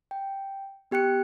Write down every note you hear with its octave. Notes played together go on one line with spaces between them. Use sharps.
G5
B3 G4 G5 F#6 C#7